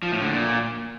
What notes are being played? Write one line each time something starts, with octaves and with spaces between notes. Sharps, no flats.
F3
A2
D3
A#2